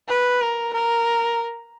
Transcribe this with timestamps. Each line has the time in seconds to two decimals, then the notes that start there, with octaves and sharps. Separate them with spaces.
0.08 B4
0.41 A#4
0.74 A#4